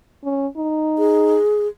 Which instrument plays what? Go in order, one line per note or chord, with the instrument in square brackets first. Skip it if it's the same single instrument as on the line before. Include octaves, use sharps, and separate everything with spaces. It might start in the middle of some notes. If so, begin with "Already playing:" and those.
[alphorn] C#4
D#4
[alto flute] G#4